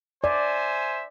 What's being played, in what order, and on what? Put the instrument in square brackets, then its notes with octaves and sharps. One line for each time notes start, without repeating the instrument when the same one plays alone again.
[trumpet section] C5 E5 G#5 [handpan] D5